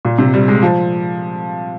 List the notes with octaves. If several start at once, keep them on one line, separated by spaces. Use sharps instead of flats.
A#2
C3
G3
G#3
F3